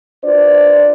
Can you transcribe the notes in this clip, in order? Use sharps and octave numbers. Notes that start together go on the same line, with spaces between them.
D4 F4 B4 C5 D5